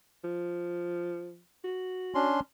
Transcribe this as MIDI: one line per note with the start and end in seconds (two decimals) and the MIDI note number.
0.24 1.40 53
1.64 2.29 66
2.15 2.40 61
2.15 2.40 62
2.15 2.40 84